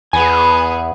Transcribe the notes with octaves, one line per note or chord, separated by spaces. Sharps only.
E2 B3 G#4 G#5